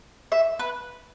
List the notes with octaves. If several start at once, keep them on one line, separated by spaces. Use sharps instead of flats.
E5
B4